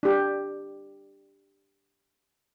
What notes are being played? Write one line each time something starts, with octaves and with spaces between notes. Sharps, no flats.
D4 G4